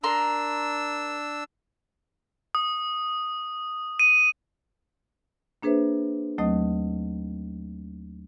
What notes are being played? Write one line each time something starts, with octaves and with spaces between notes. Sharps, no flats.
D4 A#4 A#5 C6 E6
D#6
D#7
A#3 D4 G#4 B4 C5 E5
D#2 F#3 A3 C4 D#5 D#6